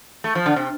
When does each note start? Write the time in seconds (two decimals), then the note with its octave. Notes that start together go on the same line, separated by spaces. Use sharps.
0.24 A3
0.35 F3
0.46 D3
0.56 C3